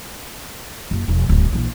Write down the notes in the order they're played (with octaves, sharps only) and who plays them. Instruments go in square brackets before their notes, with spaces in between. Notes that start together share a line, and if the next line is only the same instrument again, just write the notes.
[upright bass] F#1
E1 F3
D1 G2
A#1 E3